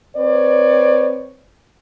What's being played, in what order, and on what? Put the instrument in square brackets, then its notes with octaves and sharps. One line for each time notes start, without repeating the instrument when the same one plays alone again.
[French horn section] C4 B4 C#5 D5